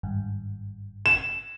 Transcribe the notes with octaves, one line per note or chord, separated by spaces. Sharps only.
G#1 G2
E7